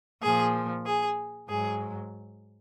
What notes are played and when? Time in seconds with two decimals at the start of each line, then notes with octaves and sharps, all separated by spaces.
0.22 A#2 F3 G#4
0.86 G#4
1.49 G#2 F#3 G#4